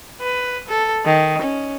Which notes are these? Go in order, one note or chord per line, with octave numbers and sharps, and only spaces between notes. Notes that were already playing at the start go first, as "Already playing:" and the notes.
B4
A4
D#3
C#4